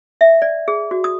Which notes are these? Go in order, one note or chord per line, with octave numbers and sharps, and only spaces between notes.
E5
D5
G#4
F#4
D#6